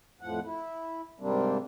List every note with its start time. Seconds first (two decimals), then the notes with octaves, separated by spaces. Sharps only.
0.21 F2 A2 F3 F#5
0.44 E4
1.20 G#2 C3 G3 A#3 C4 D4